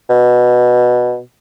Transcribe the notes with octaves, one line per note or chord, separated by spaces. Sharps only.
B2